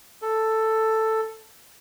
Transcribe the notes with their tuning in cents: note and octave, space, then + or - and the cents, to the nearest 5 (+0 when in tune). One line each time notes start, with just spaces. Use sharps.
A4 +5